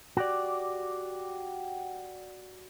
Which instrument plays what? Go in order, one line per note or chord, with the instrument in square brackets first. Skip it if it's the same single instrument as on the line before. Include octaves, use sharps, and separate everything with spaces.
[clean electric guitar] F#4 G4 D5